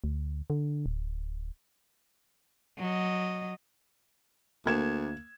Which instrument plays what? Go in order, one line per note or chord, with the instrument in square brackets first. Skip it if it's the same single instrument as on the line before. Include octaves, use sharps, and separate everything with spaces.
[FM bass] D2
D3
D1
[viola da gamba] F#3 D#5
[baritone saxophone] D2 [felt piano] A#3 G#6 E7